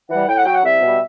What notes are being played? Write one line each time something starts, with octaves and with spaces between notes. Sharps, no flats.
E3 G3 F#5
A2 G5
F#5
F#3 G5
F#5
C2 E5
B2 G3